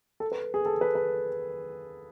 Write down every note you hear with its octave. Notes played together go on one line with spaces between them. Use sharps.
A4
B4
G#4
A4
B4
B4